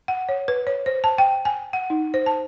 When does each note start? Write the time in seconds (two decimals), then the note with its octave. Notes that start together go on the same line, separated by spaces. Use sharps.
0.08 F#5
0.29 C#5
0.48 B4
0.67 C#5
0.86 C5
1.04 A5
1.18 G5
1.45 G#5
1.73 F#5
1.90 D#4
2.14 C5
2.26 A5